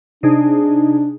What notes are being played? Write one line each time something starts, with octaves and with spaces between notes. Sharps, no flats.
C3 D4 D#4 G#4